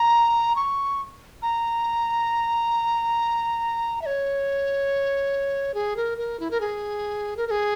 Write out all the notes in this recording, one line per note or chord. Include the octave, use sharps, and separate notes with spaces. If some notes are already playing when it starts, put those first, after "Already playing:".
Already playing: A#5
C#6
A#5
E5
C#5
G#4
A#4
A#4
E4
A#4
G#4
A#4
A#4
G#4